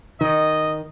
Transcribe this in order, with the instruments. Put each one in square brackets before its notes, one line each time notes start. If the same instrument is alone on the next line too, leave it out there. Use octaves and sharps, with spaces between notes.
[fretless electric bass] D#3 [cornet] D#5